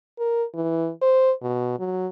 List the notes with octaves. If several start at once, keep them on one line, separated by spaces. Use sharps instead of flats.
A#4
E3
C5
B2
F#3